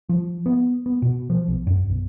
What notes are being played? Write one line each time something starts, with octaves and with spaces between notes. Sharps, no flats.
F3
B3
B3
B2
F3
B1
F#2
B1